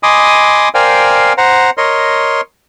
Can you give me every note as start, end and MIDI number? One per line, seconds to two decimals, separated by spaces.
0.03 0.69 75
0.03 0.69 80
0.03 0.69 83
0.03 0.69 84
0.03 0.69 86
0.03 0.69 87
0.74 1.33 70
0.74 1.33 72
0.74 1.33 74
0.74 1.33 77
0.74 1.33 79
0.74 1.33 80
1.38 1.70 72
1.38 1.70 78
1.38 1.70 82
1.78 2.41 70
1.78 2.41 73
1.78 2.41 75
1.78 2.41 84